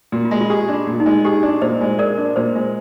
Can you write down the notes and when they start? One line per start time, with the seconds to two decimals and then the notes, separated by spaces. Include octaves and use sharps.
0.12 A#2
0.25 F4
0.31 G#3
0.41 F4
0.50 G4 G#4
0.68 D4
0.74 F4
0.87 A#2
1.00 D#4
1.06 G#3
1.25 G4 G#4
1.43 D4
1.61 A#2 C5 D#5
1.81 G#3
1.99 G#4 A#4 D5
2.18 D4
2.36 A#2 C5
2.55 G#3